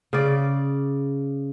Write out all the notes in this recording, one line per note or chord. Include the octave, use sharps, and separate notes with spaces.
C#3 D5